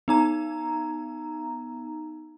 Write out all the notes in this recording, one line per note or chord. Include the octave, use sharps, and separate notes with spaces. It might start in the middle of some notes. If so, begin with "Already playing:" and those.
B3 D#4 A#5